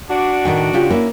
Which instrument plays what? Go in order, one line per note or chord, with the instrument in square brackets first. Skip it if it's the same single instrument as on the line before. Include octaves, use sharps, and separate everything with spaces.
[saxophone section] D4 F#4
[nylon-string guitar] A2 D#3 G5
C#3 F4 G4
A#3 C#4 E4